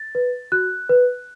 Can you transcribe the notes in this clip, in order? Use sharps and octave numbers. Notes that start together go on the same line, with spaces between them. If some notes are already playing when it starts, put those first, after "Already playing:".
Already playing: A6
B4
F#4 F#6
B4